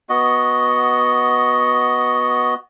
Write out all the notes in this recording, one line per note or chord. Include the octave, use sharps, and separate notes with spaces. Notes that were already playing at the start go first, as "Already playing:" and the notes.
B3 F#4 D#5